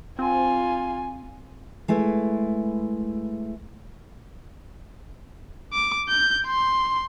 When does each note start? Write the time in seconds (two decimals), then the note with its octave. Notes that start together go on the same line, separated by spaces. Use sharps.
0.19 C4 F4 G#5
1.88 G#3 A3 E4 B4
5.73 D6
6.09 G6
6.46 C6